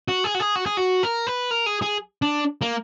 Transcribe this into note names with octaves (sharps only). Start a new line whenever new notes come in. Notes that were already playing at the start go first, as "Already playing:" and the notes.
F#4
G#4
F#4
G#4
F#4
G#4
F#4
A#4
B4
A#4
G#4
G#4
D4
A#3